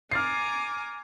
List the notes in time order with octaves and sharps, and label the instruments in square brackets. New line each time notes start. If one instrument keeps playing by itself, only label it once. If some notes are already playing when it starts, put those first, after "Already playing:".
[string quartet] G#5 A#5 D6 [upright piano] F6 A6 C7